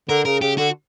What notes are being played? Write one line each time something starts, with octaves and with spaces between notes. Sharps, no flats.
D3 A#4
C#3 A#4
C#3 G4
D3 F#4